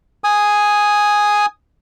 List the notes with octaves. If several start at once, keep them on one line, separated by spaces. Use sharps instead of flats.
G#5 D#6